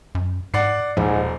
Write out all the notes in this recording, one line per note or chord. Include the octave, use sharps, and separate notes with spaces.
F#2
G#2 D5 F#5 C7
D#1 G#2 F3